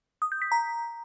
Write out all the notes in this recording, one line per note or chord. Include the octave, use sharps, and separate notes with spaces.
D#6
G6
B6
A#5